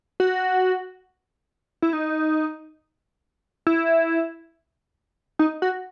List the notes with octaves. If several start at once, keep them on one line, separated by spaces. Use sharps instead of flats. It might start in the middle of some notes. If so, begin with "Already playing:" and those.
F#4
E4
D#4
E4
D#4
F#4